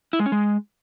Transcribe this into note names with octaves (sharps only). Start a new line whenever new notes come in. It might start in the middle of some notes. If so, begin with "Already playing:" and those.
E4
G#3
C#4
G#3